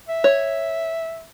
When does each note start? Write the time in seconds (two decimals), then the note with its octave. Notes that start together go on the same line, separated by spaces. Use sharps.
0.09 E5
0.24 C#5